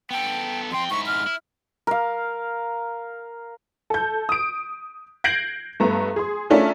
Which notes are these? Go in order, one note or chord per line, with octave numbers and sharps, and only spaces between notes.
B3 A4 G5
F2 G5 C6
G#2 E4 C#6
F6
E4
A#4 F5
A4 G6
D#6 D7
G6 G#6 A#6 C7 D7 F#7
G2 A3 B3 A#5
G#4 C6
A3 C#4 D4 F4 A#4 E5